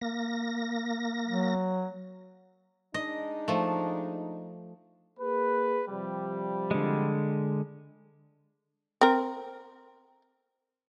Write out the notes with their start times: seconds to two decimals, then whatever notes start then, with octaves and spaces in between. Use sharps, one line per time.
0.01 A#3 A#6
1.27 F#3
2.94 G#3 D4 D#4 D#5
3.48 F3 A3
5.20 A#3 G#4 B4
5.88 C3 F3 G3
6.71 D3 G#3
9.01 C4 A#4